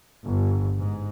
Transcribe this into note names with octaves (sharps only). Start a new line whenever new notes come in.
G1
G#2